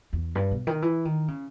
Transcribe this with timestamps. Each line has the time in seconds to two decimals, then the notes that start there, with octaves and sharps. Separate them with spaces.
0.13 E2
0.35 G2
0.51 B2
0.67 D#3
0.82 E3
1.05 D#3
1.28 C#3